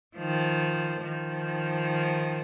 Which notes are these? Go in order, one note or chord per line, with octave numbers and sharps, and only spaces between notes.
D#3 F3
D#3 F3